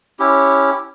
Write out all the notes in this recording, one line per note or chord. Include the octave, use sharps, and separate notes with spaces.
C#4 E4 G4